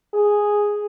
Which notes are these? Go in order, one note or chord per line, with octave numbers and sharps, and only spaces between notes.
G#4